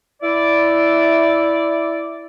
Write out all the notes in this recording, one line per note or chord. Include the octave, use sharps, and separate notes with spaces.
E4 D5